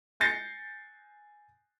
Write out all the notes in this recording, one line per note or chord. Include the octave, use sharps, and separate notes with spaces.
G#5 G6 A6 A#6 C7 C#7